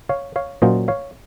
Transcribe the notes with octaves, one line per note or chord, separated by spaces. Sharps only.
C#5 F5
C#5 F5
A#2 F#3 C#4 F4 C5 D#5
C#5 F5